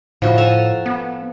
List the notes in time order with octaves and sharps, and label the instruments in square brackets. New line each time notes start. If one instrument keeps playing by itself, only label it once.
[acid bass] A2 [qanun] F3 F#4
[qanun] A4 G#5 A#5
[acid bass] B3